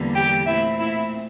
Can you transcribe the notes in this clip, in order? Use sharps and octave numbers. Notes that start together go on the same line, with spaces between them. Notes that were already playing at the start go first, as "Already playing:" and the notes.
Already playing: E2 D3 G3 A#3
G4 G5
A#2 A3 C4 E4 E5
E4 E5